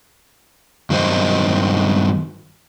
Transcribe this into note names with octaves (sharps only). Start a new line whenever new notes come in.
G2 D#3 F#3 A3 C5 D#5